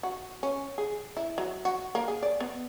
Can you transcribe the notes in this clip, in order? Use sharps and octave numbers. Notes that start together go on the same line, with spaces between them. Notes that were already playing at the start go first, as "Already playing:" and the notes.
F#4
C#4
G#4
E4
F#3
F#4
A#3
G#4
D5
B3